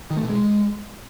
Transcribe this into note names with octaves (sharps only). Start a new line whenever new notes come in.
D#3
A3
B2
G#3